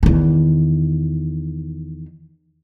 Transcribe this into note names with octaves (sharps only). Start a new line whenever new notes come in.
E2 D#3